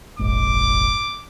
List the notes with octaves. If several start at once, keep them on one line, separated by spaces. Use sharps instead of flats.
F1 A#1 G#2 D6